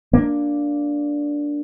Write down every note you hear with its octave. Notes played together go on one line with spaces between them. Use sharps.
A#3 D4